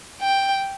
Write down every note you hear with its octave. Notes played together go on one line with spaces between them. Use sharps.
G5